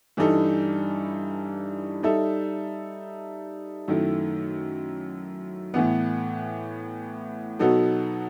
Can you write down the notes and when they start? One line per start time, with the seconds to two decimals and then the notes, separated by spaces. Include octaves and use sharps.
0.17 G2 E3 G3 D#4 A4
2.03 G3 D#4 A4 E5
3.88 F#2 D#3 A3 E4
5.74 A2 E3 B3
7.59 B2 F#3 B3 D#4 A4